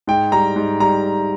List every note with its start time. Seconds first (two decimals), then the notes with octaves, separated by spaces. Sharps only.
0.07 G#2 G5
0.32 G3 A#5
0.56 G#2
0.80 G3 A#5